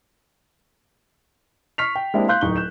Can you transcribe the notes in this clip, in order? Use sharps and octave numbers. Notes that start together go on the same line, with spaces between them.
C#6 F6 B6 C7 F7
G5
G#3 A#3 C4 D4 E4 G4
F5 C6 F#6 G6
D1 D#4 C#6 G7
G6 E7